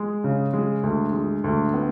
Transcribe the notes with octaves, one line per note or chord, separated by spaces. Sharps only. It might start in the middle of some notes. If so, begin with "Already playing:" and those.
Already playing: G#3
C#3
G#3
D2
G#3
D2
B3